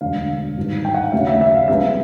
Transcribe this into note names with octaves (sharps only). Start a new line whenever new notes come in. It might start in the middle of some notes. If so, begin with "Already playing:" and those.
E1 D2 D3 F5
G#1 G2 D#3
G5
F#5
F5
D#2 C#3 F#3 A3 E5
E5
E5
F5
C2 C3 F3 G#3 B3 E5